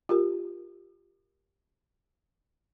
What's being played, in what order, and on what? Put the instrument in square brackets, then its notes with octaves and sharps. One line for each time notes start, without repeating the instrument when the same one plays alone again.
[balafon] F4 G4 A#4